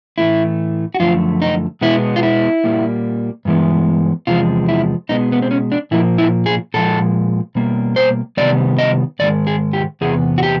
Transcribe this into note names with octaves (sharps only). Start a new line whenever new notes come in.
A2 E3 A3 E4
F#4
F#2 D3 F3 A3 F4
D#4
B2 G#3 B3 E4
F4
E4
A#2 G3 A#3
G2 E3 G#3 B3
E2 C3 F3 G#3 F4
E4
B2 G#3 B3 D#4
B3
C4
C#4
D4
A#2 F3 A#3 E4
E4
G#4
A#2 F3 G#3 A4
B2 G3 A#3
C5
C3 D#3 G3 B3 D5
D#5
G#2 D#3 G#3 D5
G#4
G4
E2 C3 B3 G#4
F#4
G4